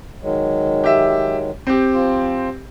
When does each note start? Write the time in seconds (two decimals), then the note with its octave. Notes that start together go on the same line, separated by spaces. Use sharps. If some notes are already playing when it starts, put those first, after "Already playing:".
0.22 D#3 F#3 G#3
0.84 G4 E5
1.67 C4 G4
1.93 F3 F4